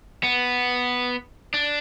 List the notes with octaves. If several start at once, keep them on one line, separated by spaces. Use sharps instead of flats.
B3
D4